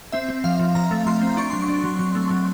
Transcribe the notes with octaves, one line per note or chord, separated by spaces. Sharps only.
C4 E5
C4
F3 F5
F3
F3 A#5
A3
F3 C6
C4
D4 C#6
F#3 C6
C#6
D4
F#3
F#3 C#6
A3
F#3